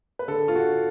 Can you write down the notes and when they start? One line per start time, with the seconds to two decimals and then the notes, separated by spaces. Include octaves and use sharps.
0.19 B4
0.28 D3 A4
0.48 F4
0.55 D3 F#4